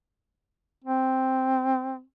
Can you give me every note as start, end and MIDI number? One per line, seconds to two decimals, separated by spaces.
0.84 2.02 60